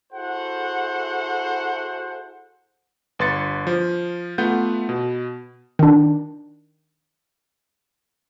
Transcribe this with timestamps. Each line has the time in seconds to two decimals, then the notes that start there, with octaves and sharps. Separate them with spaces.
0.13 E4 F#4 G#4 A4 C5 F#5
3.19 G1 B4 C6 A6 C#7
3.67 F3
4.38 A3 B3 F4 F#5 G6
4.89 B2
5.79 D#3 D4